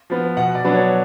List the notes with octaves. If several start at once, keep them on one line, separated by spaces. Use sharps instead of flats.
F3 B3
B2 F#5
D5
F#3 B3 D4
C#5